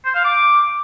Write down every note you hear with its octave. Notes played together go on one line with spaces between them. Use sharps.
C5
F5
D6